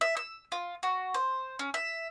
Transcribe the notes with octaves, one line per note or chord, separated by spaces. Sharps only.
E5
E6
F4
F#4
C5
C#4
E5